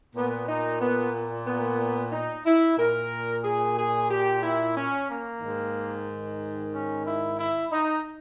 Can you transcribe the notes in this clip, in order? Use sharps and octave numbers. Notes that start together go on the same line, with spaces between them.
A#2 B3
D#4
B3
B3
D#4
E4
A#2 A#4
G#4
G#4
G4
E4
C#4
A#3
G#2 D#3
C#4
E4
E4
D#4